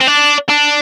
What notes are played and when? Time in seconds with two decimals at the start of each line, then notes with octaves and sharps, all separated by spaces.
0.01 C4
0.07 D4
0.49 D4